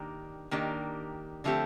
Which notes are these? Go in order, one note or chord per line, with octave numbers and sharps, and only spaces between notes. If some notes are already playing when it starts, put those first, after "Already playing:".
Already playing: D#3 A#3 D4 G4
D#3 A#3 D4 G4
D3 F3 A3 C4 G4